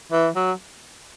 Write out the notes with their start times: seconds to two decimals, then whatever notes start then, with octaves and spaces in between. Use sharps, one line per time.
0.12 E3
0.36 F#3